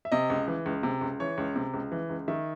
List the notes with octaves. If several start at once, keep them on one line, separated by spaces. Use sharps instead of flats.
E5
C3 D#5
C#2
E3
C#2
C3
C#2
E3 C#5
C#2
C3
C#2
E3
C#2
D#3 E5